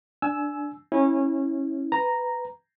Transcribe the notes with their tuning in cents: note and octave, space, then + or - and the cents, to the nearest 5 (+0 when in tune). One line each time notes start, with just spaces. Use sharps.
D4 +0 G#5 +25 E6 +0
C#4 -20 E4 -20
B4 +10 A#5 +0